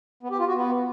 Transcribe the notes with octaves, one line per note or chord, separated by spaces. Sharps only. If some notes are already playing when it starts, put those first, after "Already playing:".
B3
G4
F4
F#4
B3